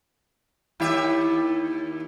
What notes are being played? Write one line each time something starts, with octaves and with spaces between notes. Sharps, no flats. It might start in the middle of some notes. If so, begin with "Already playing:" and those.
D#2 E4 G4 E5